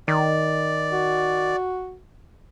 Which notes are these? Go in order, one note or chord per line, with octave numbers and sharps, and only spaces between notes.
D#3 D5
F#4